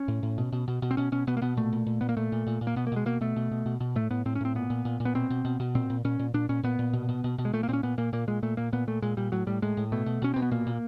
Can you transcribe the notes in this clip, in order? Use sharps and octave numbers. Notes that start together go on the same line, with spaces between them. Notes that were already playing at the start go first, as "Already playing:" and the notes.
Already playing: C#4
A2
A2
B2
B2
B2
B2
C4
B2 C#4
B2 C#4
B2 B3
A#3
B2 B3
A#2 A3
A#2
A#2
A#2 B3
A#3
A#2 A3
A#2
A#2
A#2
A#3
B2 B3
A#3
B2 G#3
B2 A#3
B2 A3
B2
B2
B2
B2
A2 A3
A2 B3
A2 C4
C#4
A2 C4
A#2 B3
A#2
A#2
A#2
B3
B2 C4
B2
B2
B2
A#2 C4
A#2
A#2 C#4
A#2
A#2 D4
A#2 C#4
A#2 B3
A#2
B2
B2
B2
B2
G#3
A#2 A3
A#3
A#2 C4 C#4
A#2 B3
A#2 A#3
A#2 A#3
A#2 G#3
A#2 A3
A#2 A#3
A#2 B3
A#2 A3
A#2 G#3
A#2 G3
A2 F#3
A2 G3
A2 G#3
A2
B2 A3
B2
B2 C#4
B2 C4
B3
A#2 A#3
A#2